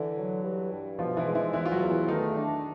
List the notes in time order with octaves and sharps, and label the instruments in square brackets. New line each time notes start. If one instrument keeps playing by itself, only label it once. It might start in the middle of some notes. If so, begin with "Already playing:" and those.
Already playing: [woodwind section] D3 [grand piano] E3 E4
[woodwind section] F#3
G2
G2
[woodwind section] B2 [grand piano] F3 F4
[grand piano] E3 E4
[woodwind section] G#3
[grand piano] E3 E4
[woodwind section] E2 [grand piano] E3 E4
[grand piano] F4
F#3 F#4
[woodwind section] E2
[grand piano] E3 E4
[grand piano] D#3 D#4 [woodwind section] A3
[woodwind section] D4